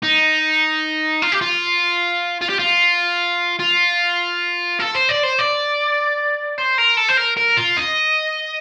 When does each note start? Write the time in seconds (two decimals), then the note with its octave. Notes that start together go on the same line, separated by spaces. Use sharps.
0.03 D#4
1.22 F4
1.32 G4
1.41 F4
2.41 F4
2.50 G4
2.59 F4
3.60 F4
4.79 A4
4.95 C5
5.09 D5
5.23 C5
5.39 D5
6.58 C5
6.78 A#4
6.97 A4
7.09 C5
7.18 A#4
7.37 A#4
7.57 F4
7.77 D#5